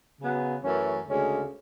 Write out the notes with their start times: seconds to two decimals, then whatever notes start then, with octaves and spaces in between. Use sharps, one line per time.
0.19 C#3 F#3 B3
0.63 F#2 E3 A3 C#4
1.06 D2 C#3 G#3 C#4